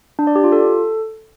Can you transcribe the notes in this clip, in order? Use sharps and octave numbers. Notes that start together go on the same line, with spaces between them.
D4
D5
G4
F4
A4